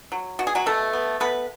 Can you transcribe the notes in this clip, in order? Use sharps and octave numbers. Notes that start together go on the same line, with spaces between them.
F#3
B2 F#4
G#4
F#3 F#4
B2 A3 A4
B3
A3 B3 B4